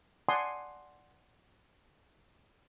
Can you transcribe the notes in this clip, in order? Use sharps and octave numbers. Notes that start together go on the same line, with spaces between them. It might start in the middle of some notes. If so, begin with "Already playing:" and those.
D5 F#5 G#5 A5 C6 D#6